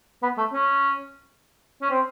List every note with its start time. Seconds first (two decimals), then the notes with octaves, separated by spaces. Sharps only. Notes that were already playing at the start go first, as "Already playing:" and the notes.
0.23 B3
0.38 A3
0.53 C#4
1.82 C#4
1.91 C4